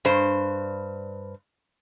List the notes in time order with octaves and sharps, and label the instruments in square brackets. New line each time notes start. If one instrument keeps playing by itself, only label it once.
[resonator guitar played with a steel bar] G2 C5